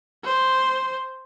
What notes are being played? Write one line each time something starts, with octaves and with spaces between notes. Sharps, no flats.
C5